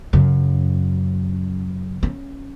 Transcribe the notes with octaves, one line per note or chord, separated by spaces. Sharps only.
F#2 C#3
C#4